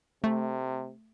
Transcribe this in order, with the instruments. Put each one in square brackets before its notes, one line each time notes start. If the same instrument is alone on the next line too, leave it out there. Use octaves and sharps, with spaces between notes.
[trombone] C3 [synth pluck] A3